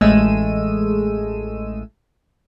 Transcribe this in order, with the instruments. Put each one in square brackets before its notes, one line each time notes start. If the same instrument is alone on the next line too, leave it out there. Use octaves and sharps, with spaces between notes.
[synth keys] A1 G#3 A3 E6 D#7